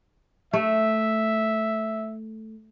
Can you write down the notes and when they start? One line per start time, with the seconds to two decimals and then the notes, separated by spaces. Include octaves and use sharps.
0.53 A3 E5